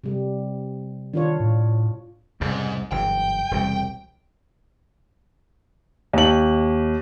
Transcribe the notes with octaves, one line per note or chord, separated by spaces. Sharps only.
C3 G3
D#3 D4 F4 C#5
A2
C2 F2 G#2 C#3
F#1 G2 E3 G5
E1 C2 G3
D#2 F#7